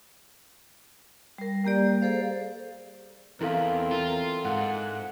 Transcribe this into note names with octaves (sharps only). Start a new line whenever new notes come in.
G3 A#4
G3 A#3 G4 D5
G#4 A4 C5 F5
E2 C4 E4 A4 A#4 F5
F4
G#2 F#5